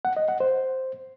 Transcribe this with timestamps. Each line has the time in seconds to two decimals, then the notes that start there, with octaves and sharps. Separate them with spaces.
0.05 F#5
0.17 D#5
0.28 F#5
0.40 C5